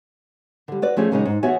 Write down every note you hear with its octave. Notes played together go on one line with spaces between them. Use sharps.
D3 G3
F#4 B4 D5
F3 A3 C#4 G#4
A#2 C#3 F#3 G#3 C#4 D#4
G#2
E2 B3 F#4 C#5 E5 G#5